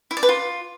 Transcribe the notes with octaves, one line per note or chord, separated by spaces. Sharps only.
E4
D5
B4
F4